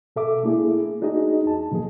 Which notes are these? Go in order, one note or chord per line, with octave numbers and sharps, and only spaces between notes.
B2 A4 E5 D6
A3 A#3 D4 E4 G#4
D4 D#4 F#4 G#4 D#5
E2 A5
B2 F3 A#3 G#4